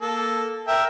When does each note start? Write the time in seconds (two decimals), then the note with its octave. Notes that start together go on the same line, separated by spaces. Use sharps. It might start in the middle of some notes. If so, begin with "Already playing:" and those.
0.01 A#3 A4
0.67 A#4 E5 G5